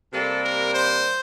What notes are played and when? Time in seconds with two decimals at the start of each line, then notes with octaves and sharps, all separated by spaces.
0.12 C3 G3 A#3 A4
0.43 A#4
0.73 C5